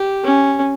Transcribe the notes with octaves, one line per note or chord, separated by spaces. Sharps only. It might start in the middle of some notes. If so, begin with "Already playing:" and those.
Already playing: G4
C#4